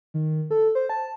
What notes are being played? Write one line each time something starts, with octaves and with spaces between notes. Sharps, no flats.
D#3
A4
C5
A5